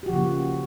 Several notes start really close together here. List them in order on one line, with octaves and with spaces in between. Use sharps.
G4 F#4 F3 C#3 A#3